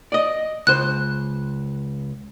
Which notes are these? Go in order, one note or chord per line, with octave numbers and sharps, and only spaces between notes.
D5 D#5
C#2 C5 F#6